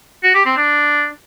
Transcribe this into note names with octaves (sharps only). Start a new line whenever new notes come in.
F#4
G4
C4
D4